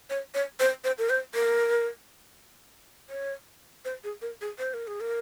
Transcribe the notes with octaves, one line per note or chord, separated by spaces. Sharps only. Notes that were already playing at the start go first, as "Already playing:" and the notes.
C#5
C#5
C5
C5
A#4
C5
A#4
C#5
C5
G#4
A#4
G#4
C5
A#4
G#4
A#4